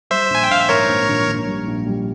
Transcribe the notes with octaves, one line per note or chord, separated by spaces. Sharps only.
G3 C5 E5
A#1 G#5
G5
A#1 F5
E5
G#2 A#4 C#5
A#1
A#1
A#1
G3
A#1
G3